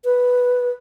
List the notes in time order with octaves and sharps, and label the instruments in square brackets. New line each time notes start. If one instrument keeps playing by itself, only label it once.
[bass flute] B4